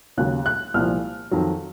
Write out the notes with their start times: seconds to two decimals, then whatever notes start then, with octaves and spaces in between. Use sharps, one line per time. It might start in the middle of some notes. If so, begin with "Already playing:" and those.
0.17 D#2 C#3 F#3 F#6
0.46 F#6
0.74 C2 A#2 F3 F6
1.31 F2 D#3 F#3